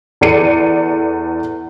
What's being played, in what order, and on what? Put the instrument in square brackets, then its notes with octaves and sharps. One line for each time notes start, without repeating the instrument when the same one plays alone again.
[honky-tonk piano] E2 A4 D5 C#7 D#7